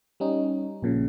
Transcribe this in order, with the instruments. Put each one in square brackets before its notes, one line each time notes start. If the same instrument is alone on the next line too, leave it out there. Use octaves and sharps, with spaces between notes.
[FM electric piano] G3 C#4 D#4
A#1 A#2 C#3